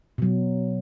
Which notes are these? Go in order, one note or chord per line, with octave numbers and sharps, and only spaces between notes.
B2 F#3